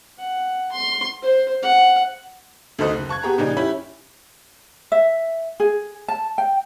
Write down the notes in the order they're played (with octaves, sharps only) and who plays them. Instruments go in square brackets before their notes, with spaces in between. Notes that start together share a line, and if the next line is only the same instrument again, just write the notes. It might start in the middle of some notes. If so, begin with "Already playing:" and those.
[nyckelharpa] F#5
C6
C5
F#5
[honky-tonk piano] D2 D#3 A4 C5 D#5 F#6
F#1
A5 C#6 F#6 G#6
B3 G4 G#4 A#5
A#2 C#3 F3 D4 D#4 G4
C#4 E4 G4 B5
[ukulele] E5
G#4
A5
G5